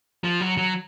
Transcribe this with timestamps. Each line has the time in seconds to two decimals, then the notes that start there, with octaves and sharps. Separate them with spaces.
0.24 F3
0.41 F#3
0.58 F#3